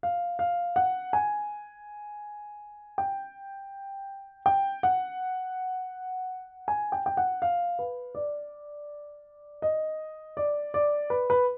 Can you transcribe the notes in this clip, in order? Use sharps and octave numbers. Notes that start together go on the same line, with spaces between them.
F5
F5
F#5
G#5
G5
G5
F#5
G#5
G5
G5
F#5
F5
B4
D5
D#5
D5
D5
B4
B4